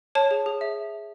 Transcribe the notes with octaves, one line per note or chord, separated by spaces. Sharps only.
C#5 A5
G#4
G#4
E5